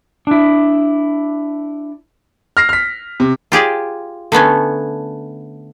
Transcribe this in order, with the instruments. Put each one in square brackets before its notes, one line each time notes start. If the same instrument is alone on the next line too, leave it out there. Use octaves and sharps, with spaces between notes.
[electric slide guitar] D4 E4
[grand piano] F6 A#6 C7
F6 B6
C3
[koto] F4 G4 G#4 D5
D3 A3 B3 C#4